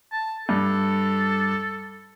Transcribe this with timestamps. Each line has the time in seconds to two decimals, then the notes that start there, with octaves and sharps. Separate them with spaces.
0.12 A5
0.49 G2 A4